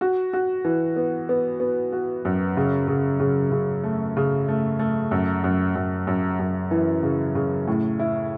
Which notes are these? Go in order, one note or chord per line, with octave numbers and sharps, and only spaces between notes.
F#4
F#4
E3
B3
B3
B3
F#4
F#2
C#3
C#3
C#3
C#3
A3
C#3
A3
A3
F#2
F#2
F#2
F#2
F#2
E3
C#3
C#3
A2
E4